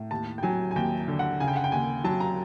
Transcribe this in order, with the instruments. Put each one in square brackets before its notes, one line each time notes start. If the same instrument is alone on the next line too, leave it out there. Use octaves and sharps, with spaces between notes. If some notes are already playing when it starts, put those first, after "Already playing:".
Already playing: [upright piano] A2
D#2 A5
G5
F#3 G#5
G#5
D#2 G5
D3
F#5
C#3 G#5
G5
F#5
G5
D#2 G#5
F#3 A5
A#5